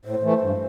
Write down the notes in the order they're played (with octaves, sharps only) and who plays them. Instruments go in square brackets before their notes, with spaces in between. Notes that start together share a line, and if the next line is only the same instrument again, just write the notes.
[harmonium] A2 [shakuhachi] C5
[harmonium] E3 A3
G2